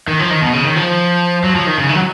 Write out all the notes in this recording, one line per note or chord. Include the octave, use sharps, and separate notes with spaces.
D#3
F3
D#3
B2
C#3
D#3
F3
F#3
F3
D#3
C#3
D#3
F#3